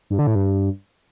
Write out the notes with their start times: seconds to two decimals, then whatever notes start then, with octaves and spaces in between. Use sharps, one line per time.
0.10 G2
0.19 D3
0.27 A2
0.35 G2